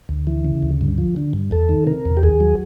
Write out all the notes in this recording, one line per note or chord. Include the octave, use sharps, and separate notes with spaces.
D2
E3
C#3
D2
G2
F3
D3
G2
E2 A4
D#3
C3 A#4
E2
G4
D#2 G#4
F#3